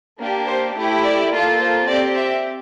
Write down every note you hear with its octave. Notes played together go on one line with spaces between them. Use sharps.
A#3 D4 G4
C5
A3 E4 G4
D5
A#3 F4 A4
C5
C4 G4 D5
E5